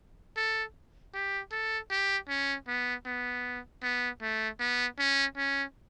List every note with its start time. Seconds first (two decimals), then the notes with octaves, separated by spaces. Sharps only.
0.37 A4
1.14 G4
1.51 A4
1.90 G4
2.28 C#4
2.67 B3
3.06 B3
3.83 B3
4.22 A3
4.60 B3
4.99 C#4
5.37 C#4